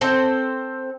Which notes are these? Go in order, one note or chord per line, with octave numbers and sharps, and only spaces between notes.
C4 A4 C5